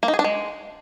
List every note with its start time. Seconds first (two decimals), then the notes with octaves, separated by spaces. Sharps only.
0.03 A#3
0.08 D#4
0.14 G#4
0.19 D4
0.24 G#3